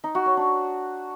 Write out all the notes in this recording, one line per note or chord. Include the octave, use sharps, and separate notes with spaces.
D#4
F#4
C#5
D4